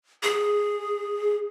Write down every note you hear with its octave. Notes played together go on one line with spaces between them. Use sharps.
G#4